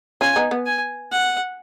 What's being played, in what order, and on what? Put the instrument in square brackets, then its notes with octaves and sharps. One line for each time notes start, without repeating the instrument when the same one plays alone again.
[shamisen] C#4 F4 [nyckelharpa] G#5
[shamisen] B3 D#4
B3
[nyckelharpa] G#5
F#5